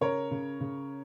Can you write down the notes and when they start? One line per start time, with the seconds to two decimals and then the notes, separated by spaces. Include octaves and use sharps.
0.01 C#3 A#4 C#5
0.31 C#3
0.60 C#3